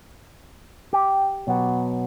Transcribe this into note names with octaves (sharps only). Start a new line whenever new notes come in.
G4
B2 F#3 B3